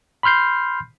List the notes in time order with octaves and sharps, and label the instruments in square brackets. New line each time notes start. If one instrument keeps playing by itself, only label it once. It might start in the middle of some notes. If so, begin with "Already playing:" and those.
[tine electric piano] B5 C6 F6 G6 C7